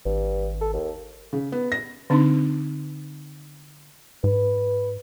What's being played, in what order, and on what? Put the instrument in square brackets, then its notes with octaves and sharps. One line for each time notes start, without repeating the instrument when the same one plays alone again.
[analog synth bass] G#1 [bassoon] G2
[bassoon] A4
D#2
[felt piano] C#3
B3
A#6
[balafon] D3 C4 D4 D#4
[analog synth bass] G#2 [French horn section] B4